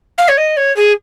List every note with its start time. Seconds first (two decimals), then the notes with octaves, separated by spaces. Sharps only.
0.18 F5
0.28 C#5
0.38 D#5
0.57 C#5
0.76 G#4